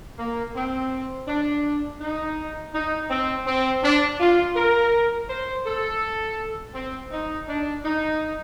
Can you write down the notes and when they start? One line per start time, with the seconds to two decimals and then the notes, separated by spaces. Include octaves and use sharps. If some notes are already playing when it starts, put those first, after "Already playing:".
0.19 A#3
0.55 C4
1.28 D4
2.01 D#4
2.74 D#4
3.10 C4
3.46 C4
3.83 D4
4.20 F4
4.56 A#4
5.29 C5
5.66 A4
6.74 C4
7.11 D#4
7.48 D4
7.85 D#4